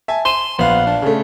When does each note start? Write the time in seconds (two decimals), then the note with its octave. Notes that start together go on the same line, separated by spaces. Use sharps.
0.08 E5 G#5 A5
0.25 C6 D#7 E7 G7
0.59 A#1 B3 F5
0.86 D4
1.02 C#3 A3